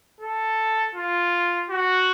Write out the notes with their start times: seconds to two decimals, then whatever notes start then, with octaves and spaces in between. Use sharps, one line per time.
0.21 A4
0.95 F4
1.70 F#4